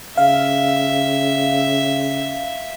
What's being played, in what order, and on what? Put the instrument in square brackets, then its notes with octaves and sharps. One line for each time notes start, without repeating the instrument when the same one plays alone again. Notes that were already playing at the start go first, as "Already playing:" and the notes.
[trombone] C#3 [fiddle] E5 [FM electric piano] F5